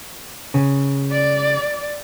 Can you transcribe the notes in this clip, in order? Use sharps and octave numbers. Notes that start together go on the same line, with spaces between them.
C#3
D5